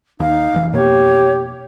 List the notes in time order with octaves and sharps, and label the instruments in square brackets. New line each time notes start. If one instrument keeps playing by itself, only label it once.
[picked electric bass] D#2 [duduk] D#4 [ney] F5
[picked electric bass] F1 E3
[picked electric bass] F2 B2 A#3 [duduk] G4 [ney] C#5